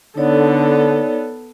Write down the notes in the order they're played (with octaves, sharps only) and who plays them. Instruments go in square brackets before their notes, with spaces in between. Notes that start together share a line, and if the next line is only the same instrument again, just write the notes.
[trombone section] D3 [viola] B3 A4 [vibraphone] D#4 C#5 D5